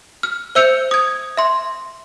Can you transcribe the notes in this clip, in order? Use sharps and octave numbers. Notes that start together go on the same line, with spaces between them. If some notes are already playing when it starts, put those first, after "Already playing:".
F6
C5 E5 E6 G6 C#7 F7
D#6 G#6
E5 C6